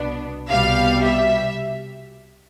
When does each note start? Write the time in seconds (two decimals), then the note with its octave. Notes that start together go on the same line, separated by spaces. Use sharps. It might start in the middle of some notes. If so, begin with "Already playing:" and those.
Already playing: C2 B2 B3 D4
0.50 C2 B2 G3 F5
1.03 E5